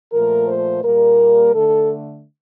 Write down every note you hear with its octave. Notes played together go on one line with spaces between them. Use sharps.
A#2 F3 A3 A#4
C5
A#2 G3 A#3 A#4
D3 A3 A4